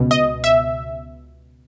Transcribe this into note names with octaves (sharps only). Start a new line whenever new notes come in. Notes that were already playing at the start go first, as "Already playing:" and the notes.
Already playing: C#2 B2
D#5
E5